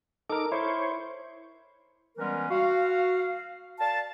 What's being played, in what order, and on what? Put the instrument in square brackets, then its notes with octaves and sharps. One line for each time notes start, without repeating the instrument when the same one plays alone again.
[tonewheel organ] D#4 D6 [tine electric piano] A4 A#4
[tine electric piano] E4 [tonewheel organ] C5 C#5
[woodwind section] E3 G3 G#3 B3 C#4 A#4
F#4 F5
A#4 D5 F5 A5